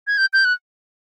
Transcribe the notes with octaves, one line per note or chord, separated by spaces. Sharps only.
G#6
G6
G6
F#6